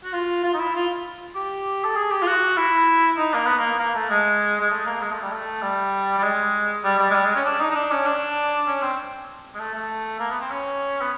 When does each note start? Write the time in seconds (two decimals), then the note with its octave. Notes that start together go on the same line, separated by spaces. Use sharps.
0.04 F#4
0.13 F4
0.44 F4
0.54 D#4
0.59 E4
0.74 F4
1.35 G4
1.84 A4
1.96 G#4
2.11 G4
2.22 F4
2.27 F#4
2.57 E4
3.18 D#4
3.34 A#3
3.46 B3
3.58 A#3
3.79 A#3
3.95 A3
4.10 G#3
4.61 G#3
4.70 A3
4.86 A#3
5.01 G#3
5.11 A3
5.22 G3
5.31 A3
5.62 G3
6.18 G3
6.23 G#3
6.84 G3
6.99 G3
7.11 G#3
7.14 G3
7.25 G#3
7.35 C#4
7.45 D4
7.61 D#4
7.71 D#4
7.75 D4
7.91 C#4
8.06 D4
8.67 C#4
8.82 C4
9.55 G#3
9.59 A3
9.74 A3
10.20 A#3
10.30 B3
10.41 C4
10.50 C#4
11.01 B3